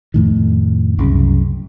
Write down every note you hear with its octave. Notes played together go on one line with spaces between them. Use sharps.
F2 A2 D#3
C2 F#2 C#3